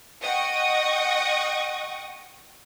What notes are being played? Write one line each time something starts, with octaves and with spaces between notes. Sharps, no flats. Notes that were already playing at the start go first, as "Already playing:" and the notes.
D#5 F#5 G5 C#6 D#6